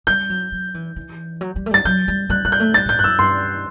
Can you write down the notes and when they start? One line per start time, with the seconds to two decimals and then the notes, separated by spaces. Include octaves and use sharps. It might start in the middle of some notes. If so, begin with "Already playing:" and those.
0.07 G3 G6
0.30 F#3
0.52 F#3
0.74 E3
0.96 E3
1.41 F#3
1.56 G3
1.66 A3
1.71 G3 A6
1.85 F#3 G6
2.08 G3
2.30 G3 F#6
2.45 G3 F#6
2.52 G6
2.60 A3
2.74 G3 A6
2.85 A2 G6
2.97 G2 F#6
3.04 F#2 E6
3.19 G2 C6